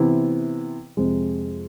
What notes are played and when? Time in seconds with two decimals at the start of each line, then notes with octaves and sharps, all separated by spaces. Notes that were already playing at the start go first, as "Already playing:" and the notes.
Already playing: C3 E3 B3 E4
0.97 F2 C3 G#3